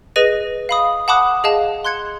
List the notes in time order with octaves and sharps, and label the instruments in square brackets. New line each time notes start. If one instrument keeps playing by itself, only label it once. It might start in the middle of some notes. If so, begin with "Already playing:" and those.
[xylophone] G#4 B4 D#5 A#6 D#7
F5 B5 D#6
F#5 A5 B5 D6 D#6 F#6
G#4 D#5 F5 A5
C6 F#6 G#6 C#7